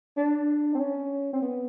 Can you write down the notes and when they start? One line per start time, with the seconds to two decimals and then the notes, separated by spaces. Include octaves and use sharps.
0.17 D4
0.74 C4
0.79 C#4
1.33 C4
1.42 B3